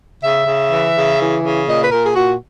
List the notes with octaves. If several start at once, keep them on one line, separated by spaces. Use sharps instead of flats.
C#3 E5
C#3
E3
C#3
E3
C#3
A#2 D#5
B4
A#2 A#4
G#4
A#2 F#4